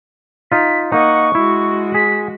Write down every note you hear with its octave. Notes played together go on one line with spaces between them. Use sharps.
D#4 F4 B6
A#3 D#4 D#5 F#5 C#6
G#3 E4 F#4
G#4 B6